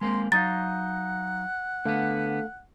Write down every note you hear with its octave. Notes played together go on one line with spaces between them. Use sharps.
G#3 A#3 C4 C6
F#3 D#4 F5 F#5 A#5 D#6 G6 A6
D3 A3 B3 A4 F5